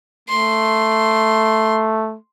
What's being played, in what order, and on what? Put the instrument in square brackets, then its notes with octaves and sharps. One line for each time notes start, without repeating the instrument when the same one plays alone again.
[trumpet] A3 [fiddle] C6